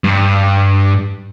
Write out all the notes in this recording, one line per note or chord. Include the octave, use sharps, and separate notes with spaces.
G2